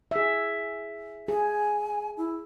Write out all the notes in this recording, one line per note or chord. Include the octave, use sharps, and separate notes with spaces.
G#4 E5
G#4 G#5
E4